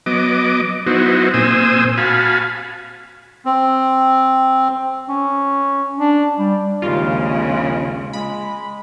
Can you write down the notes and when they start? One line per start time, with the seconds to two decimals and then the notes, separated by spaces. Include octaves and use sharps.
0.06 F#3 B3 D#5 D6
0.86 F#3 B3 D#4 E4 F#4 C5
1.34 A#2 C4 C5 G#5 D#6 E6
1.98 F#4 F5 G#5 A5 B5
3.46 C4
5.09 C#4
5.99 D4
6.39 G3
6.82 A#1 D#2 C#3 G#3 F4
8.13 G#3 B5